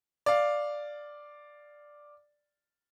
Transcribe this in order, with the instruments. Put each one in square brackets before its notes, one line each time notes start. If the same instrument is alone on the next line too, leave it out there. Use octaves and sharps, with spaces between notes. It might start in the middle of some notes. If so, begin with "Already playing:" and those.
[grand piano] D5 F5